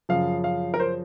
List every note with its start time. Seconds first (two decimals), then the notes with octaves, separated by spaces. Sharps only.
0.09 F#2 C#3 F3 F5
0.44 F5
0.74 A#4
0.80 C5